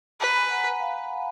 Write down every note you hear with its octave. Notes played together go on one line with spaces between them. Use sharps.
B4 B5
A#5
G#5 B5
F#5 A#5
F5 G#5